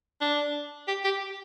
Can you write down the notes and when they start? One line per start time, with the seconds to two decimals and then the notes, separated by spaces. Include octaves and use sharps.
0.21 D4
0.88 G4
1.05 G4